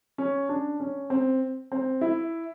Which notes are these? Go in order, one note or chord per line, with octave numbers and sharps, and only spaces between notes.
C#4
D4
C#4
C4
C4
E4